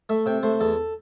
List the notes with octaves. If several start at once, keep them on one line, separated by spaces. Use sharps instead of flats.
A3 E5
C3 G5
A3 C5
E2 A4